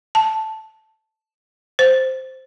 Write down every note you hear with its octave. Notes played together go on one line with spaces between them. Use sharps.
A5
C5